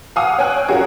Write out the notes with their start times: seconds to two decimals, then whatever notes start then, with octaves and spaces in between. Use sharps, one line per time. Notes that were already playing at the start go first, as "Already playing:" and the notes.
0.16 F5 F#5 G#5 D#6 E6
0.38 C#5 G5 G#5 F#6
0.68 C#4 F4 F#4 G#4 A#4 C#5